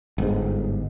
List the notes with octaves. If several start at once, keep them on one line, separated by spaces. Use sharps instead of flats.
G1 G#2